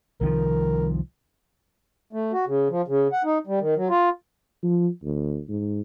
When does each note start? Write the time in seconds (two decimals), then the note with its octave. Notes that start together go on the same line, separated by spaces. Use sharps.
0.21 C2 D#3 F3 A#4
2.13 A3
2.32 F#4
2.47 C#3
2.70 F3
2.88 C#3
3.12 F#5
3.24 D#4
3.47 G3
3.60 D#3
3.77 F#3
3.90 F4
4.63 F3
5.04 D2
5.49 G#2